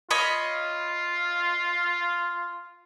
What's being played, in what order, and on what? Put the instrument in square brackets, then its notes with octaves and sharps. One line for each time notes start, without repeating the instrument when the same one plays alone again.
[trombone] F4 [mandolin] C#5 D#5 B5